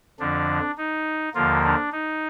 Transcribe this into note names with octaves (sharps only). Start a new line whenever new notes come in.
F2 D3 F3 D4
D#4
D#2 D3 F3 A#3 F4
D4
D#4